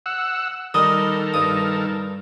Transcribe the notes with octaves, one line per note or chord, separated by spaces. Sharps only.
F#5 E6
D#3 G3 A4 A#4 D#5 D#6
G2 D#6